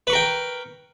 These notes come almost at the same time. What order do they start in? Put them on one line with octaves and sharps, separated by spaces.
B4 C#6 A#4 G5